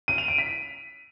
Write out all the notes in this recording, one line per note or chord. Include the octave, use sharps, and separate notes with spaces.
D#7
F7
D7
B6